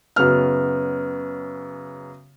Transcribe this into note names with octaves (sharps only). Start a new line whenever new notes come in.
F#2 C#3 B3 F6